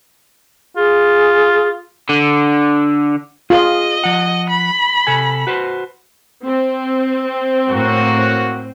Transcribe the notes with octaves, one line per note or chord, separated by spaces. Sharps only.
F4 G#4
D3
F4 G#4 D#5
F3 F#5
B5
C3 A4 G#5
F#4 B4 C5
C4
A2 A#3 F#4